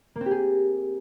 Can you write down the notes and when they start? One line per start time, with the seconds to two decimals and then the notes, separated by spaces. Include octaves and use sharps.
0.16 A#3
0.21 C4
0.26 G4
0.31 G#4